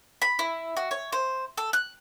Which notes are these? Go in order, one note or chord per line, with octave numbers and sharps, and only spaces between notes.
B5
E4
F#4
C#5
C5
A4
F#6